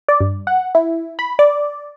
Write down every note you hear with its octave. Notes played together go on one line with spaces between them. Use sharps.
D5
G2
F#5
E4
B5
D5